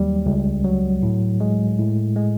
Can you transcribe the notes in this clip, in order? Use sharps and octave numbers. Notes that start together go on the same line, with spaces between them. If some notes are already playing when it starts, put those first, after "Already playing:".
Already playing: D#2 F#3 G3
C#2
F#3
A2
G#3
A2
G#3